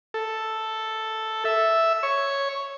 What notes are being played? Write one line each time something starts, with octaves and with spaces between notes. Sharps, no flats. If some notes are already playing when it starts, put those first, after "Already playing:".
A4
E5
C#5